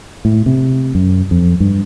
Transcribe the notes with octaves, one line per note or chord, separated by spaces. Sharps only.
A2
C3
F#2
F2
G2